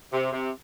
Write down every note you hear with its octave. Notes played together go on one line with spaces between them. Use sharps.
C3
C3